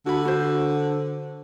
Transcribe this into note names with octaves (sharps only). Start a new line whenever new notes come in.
D3 F#4 B5
F#4 C5